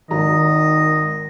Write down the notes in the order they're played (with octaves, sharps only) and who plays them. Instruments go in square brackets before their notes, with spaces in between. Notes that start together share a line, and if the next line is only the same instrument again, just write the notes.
[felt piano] G#1 A#5 [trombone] D#3 [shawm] D#5